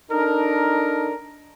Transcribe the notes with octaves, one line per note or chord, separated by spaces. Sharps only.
D4 D#4 A4 A#4